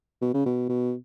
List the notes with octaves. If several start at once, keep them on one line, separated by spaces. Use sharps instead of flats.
B2
C#3
B2
B2